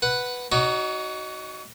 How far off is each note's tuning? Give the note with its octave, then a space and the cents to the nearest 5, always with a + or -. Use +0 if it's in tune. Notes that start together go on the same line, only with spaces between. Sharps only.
B4 +0 F#5 +0
D#4 +0 F#4 +10 C#5 +40